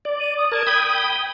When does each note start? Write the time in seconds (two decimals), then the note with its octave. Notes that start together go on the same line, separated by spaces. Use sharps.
0.05 D5
0.20 D#7
0.37 D#6
0.52 A#4 A5 G#6
0.67 G5 B5 D#6
0.95 G7